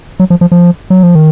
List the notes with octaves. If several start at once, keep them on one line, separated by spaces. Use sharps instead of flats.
F#3
F3
F3
F3
F#3
F3
D#3